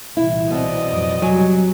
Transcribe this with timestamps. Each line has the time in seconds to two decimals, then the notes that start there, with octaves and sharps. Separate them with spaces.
0.17 C2 A#2 E3 E4
0.51 B2 B3 C4 D5 D#5
0.87 F2 A2 F#3
1.22 C3 F#3 G3 G#5